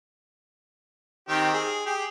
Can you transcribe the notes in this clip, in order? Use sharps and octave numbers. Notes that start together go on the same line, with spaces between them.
D#3 C4 G4
G#4
G4 G#4